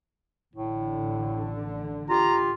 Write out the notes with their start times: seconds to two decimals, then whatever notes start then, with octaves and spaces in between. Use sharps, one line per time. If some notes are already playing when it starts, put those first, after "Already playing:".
0.55 A1 A2 D3
2.09 F4 G4 A#5